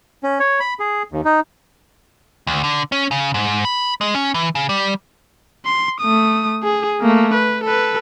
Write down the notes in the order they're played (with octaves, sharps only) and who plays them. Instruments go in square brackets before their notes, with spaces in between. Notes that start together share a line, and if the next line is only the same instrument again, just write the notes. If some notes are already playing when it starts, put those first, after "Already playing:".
[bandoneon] C#4
C#5
B5
G#4
D#2
D#4
[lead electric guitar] D2
D3
C#4
C#3
G#2
B5
G#3
C#4
E3
C#3
G3
[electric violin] C6
A3 D#6
G#4
A3 A#3
B4
A4 B4